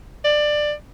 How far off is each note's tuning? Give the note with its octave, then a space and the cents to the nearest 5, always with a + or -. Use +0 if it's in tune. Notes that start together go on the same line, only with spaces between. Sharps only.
D5 +20